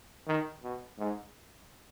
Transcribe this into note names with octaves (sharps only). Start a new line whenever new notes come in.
D#3
B2
G#2